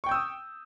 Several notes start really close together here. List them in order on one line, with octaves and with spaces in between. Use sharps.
C#6 G5 G6 E6 D#6